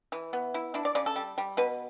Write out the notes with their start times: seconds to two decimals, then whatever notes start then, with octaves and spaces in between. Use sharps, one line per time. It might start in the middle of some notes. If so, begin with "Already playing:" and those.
0.12 E3
0.33 B3
0.54 E4
0.74 D4 E4
0.85 D5
0.95 C#3 D5
1.06 A4
1.16 G3
1.38 G3
1.57 B2 B4